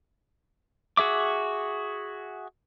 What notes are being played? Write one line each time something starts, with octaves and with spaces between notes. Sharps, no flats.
F#4 G#4 E5 D6